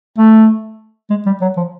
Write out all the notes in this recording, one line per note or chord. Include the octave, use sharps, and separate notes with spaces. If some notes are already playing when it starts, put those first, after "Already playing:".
A3
G#3
G3
F#3
F3